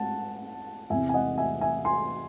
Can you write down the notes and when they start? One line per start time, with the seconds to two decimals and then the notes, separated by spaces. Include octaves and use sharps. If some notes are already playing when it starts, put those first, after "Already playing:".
Already playing: G#3 F#5 A5
0.90 E2 C3 E3 C4 E5 G#5
1.09 G#5
1.14 D#5 F#5
1.38 E5 G#5
1.61 E5 G#5
1.85 G#5 C6